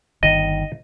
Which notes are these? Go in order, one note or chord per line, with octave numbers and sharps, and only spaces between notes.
G1 D#3 D#5